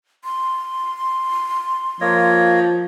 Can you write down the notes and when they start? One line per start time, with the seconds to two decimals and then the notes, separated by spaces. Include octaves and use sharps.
0.24 C6
2.01 F3 A#3 C#5 D#5